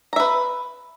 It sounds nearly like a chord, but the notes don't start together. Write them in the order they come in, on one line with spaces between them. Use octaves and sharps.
A#5 E5 B4